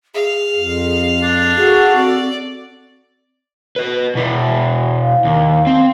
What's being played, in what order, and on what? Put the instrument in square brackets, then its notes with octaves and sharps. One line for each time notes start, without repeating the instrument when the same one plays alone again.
[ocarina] G#4 [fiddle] F5
[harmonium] F2
[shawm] D4
[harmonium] F#4 A4 [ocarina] G#4
[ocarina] C4 [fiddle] D5
[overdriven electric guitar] B4 D#5
B2 E4
[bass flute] F5
[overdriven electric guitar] D#2
C4